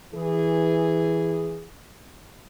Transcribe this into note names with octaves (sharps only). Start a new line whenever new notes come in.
E3 G#4